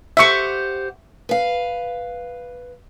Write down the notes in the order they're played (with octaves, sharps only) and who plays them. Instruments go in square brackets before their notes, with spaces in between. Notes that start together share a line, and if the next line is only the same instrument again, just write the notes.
[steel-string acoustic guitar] G4 C5 F#5 [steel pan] E5 C#6
[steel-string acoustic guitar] B4 F5